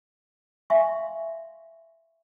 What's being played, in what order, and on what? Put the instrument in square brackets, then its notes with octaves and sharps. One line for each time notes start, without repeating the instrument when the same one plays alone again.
[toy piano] E5 F5 G#5 C6 C#6